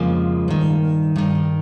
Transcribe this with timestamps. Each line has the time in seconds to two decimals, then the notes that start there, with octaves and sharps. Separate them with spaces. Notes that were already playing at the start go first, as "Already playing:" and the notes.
Already playing: F2 C#3 F3 G#3 A#3
0.48 G2 D#3
1.16 G2 D#3